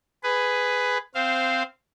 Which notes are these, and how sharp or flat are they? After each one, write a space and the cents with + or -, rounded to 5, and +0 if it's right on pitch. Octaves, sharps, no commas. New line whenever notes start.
G#4 +0 B4 +10
C4 -10 C5 +0 F5 -10